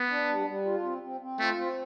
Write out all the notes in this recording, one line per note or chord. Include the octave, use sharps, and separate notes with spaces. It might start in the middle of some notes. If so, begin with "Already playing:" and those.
Already playing: B3
D4
G3
G3
F4
C4
C4
C4
A3 F4
C4